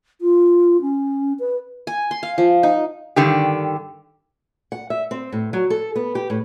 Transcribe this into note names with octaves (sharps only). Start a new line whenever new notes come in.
F4
C#4
B4
G#5
C6
F5
F3
D#4
G2 D3 D#3 G4
F#5
E5
C4
A2
F#3
A4
B3
G4
A2